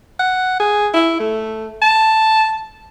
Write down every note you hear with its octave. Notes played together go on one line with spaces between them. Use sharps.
F#5
G#4
E4
A3
A5